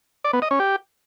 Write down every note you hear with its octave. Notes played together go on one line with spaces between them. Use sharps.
D5
B3
D#5
C#4
G4